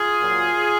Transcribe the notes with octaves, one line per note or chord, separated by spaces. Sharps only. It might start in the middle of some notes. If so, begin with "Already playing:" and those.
Already playing: F4 G#4
A#2 F#3